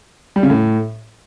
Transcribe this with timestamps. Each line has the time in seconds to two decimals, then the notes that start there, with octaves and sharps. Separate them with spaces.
0.36 G3
0.43 C#3
0.50 A2